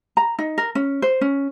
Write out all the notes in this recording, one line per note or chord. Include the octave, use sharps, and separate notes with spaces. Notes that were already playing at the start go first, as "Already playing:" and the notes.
A#5
D#4
A#4
C#4
C5
C#4